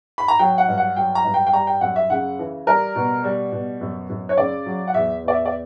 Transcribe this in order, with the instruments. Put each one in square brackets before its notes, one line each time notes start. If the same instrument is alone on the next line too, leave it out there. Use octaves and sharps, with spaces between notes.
[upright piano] B5
A#5
F#3 G5
F#5
G2
F#5
F#3 G5
A#5
G2
G5
G5
G3 A#5
G5
F#2 F#5
E5
C#3 F#5
E3
G3 A#4
B2
G3
B2
F#2
F#2
C#5
C#3 D5
F#3
F#5
E2 E5
E2 D5
E5
D5